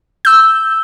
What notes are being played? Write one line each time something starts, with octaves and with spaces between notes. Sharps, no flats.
E6 G6